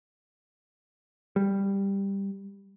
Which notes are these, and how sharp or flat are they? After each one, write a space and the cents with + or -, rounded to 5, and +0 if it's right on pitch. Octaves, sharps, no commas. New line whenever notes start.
G3 +10